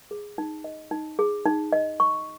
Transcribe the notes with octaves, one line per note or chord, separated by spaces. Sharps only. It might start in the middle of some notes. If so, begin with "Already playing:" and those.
G#4
D#4
D#5
D#4
G#4
D#4
D#5
C#6